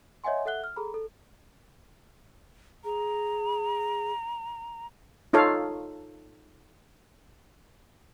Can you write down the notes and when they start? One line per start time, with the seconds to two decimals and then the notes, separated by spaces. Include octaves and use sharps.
0.24 C#5 D#5 E5 F#5 G#5 C6
0.45 A4 E5 F#5 F#6 G7
0.64 F6
0.76 G#4 A4 A#5 B5
0.94 A4
2.84 G#4 A#5
5.33 D#4 F4 A4 C#5 F5